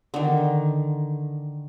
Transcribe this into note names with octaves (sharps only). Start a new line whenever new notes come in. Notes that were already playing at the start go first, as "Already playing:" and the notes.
D3 D#3